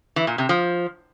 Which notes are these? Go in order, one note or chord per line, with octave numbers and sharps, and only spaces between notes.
E3
A#2
C3
F3